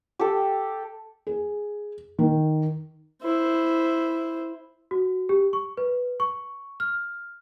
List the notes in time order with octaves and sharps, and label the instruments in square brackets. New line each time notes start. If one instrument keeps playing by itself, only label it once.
[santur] G4 A4
[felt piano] G#4
D#3
[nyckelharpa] E4 C5
[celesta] F#4
G4
C#6
B4
C#6
F6